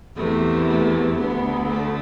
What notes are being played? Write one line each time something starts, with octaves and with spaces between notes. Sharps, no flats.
E2 C3 E3 A3
A3
D2 D3 B3
A3